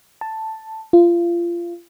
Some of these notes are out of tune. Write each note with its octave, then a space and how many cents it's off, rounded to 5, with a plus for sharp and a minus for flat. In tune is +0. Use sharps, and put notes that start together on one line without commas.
A5 +5
F4 -25